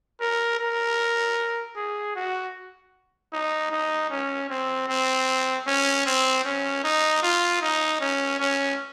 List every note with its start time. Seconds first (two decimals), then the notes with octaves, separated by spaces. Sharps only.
0.20 A#4
0.60 A#4
1.76 G#4
2.15 F#4
3.33 D#4
3.71 D#4
4.10 C#4
4.49 C4
4.88 C4
5.66 C#4
6.06 C4
6.44 C#4
6.84 D#4
7.23 F4
7.61 D#4
8.00 C#4
8.39 C#4